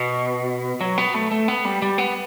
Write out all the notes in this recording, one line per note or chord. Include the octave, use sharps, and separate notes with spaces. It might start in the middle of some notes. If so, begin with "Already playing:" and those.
Already playing: B2
F#3
B3
A3
A3
B3
G3
G3
B3